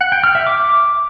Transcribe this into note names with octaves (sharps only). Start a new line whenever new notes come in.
F#5
G5
F6
E5
D6